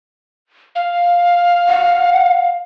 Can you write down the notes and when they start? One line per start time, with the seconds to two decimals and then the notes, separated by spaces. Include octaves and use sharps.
0.75 F5
1.68 F#5